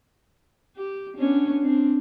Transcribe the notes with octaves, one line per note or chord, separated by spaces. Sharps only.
G4
B3 C#4 D4
C4 D4